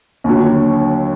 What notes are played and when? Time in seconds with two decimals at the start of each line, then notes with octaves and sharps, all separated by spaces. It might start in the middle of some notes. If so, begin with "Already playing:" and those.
0.24 D#2 D3 F#3